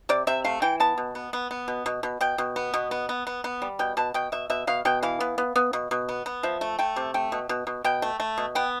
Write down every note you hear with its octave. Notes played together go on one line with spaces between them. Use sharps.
C3 D5
C3 E5
A3 F5
E3 G5
B3 A5
B2
B3
B3
B3
B2
B2
B2
B2 G5
B2
B3
B2
B3
B3
B3
B3
G3
B2 G5
B2 A5
B2 G5
B2 E5
B2 E5
B2 F5
B2 G5
E3 F5
B3
B3
B3
B2
B2
B3
B3
F3 E5
A3
A3 G5
C3
A3 G5
B2
B2
B2
B2 G5
A3
A3
B2
B3 G5